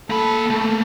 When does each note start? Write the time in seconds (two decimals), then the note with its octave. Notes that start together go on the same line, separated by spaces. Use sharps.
0.10 A#3 A4 B5
0.50 A3 A#3